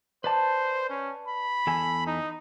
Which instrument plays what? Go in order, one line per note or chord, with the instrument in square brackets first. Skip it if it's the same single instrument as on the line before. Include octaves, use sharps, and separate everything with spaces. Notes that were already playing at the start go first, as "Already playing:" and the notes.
[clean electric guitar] B4 D5 A5 [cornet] C5
[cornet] C#4
B5
[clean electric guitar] E2 A4 G#5
[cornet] D#4